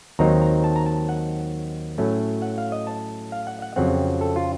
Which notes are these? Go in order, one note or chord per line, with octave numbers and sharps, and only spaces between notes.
D#2 D#3 F#3 C4 D#4 A#5
A#5
A5
A#5
A5
F#5
A2 F#3 A3 C#4
F#5
F5
D#5
A5
F5
F#5
F#5
F2 C#3 F#3 C4 F#5
A4
F4